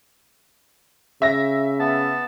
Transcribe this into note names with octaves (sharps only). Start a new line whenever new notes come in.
C#3 E5 A#6
B3 A5